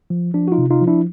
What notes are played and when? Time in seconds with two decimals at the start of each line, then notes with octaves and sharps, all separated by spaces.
0.10 F3
0.34 F3 D4
0.48 F#4
0.52 D#4 F4
0.58 C3
0.70 D#4 F4
0.82 F3
0.88 D4 E4